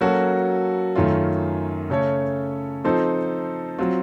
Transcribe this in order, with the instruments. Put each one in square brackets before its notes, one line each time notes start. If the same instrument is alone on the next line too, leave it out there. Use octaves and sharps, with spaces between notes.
[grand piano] F#3 A#3 C#4 F#4 A4
F#2 D#3 A3 C#4 F4
C#3 A3 C#4 A4 C#5
F3 C4 D#4 A4 C5
F#3 C4 F4